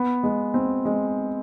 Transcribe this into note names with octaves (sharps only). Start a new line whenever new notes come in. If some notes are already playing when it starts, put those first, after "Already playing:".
Already playing: B3
G#3
C4
G#3